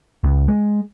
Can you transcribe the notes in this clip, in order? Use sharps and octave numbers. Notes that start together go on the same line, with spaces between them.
C#2
G#3